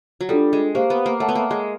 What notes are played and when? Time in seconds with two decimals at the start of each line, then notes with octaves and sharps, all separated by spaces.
0.21 F#3
0.29 G3 D4 F4 A4
0.53 G#3
0.75 A#3 G4 C5 F5
0.90 B3
1.06 A#3
1.20 A3 C#5 F#5 A5
1.29 B3
1.35 A#3
1.51 G#3